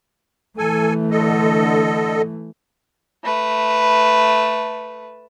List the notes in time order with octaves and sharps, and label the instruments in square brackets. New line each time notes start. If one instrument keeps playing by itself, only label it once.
[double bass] E3 A3 [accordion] A4 G#5
[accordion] D3 A4 D#5
[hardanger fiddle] A3 B4